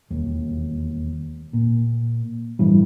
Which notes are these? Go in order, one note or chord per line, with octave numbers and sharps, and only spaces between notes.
E1 D#2
A#2
A1 G2 E3 G3